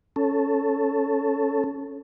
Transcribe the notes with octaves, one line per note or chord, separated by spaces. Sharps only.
C#4 A4